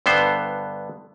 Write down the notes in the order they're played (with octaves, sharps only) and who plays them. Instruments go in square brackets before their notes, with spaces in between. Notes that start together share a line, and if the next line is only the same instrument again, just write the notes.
[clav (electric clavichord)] G2 D3 B3 C5